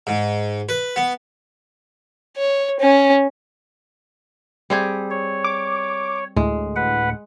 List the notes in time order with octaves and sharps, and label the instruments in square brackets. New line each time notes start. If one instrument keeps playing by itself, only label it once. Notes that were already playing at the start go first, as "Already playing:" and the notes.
[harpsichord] G#2
B4
B3
[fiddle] C#5
C#4
[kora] G3 C4 G#4
[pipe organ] C#5
[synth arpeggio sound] D6
[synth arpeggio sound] D2 A2 [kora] G#3
[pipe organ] B4 F#5